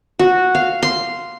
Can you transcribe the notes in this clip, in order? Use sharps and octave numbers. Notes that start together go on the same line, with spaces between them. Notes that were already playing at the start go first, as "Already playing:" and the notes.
F#4
F5
C6